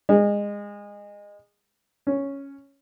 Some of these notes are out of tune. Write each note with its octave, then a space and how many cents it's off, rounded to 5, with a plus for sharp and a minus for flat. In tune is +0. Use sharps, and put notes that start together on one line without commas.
G#3 -25
C#4 +0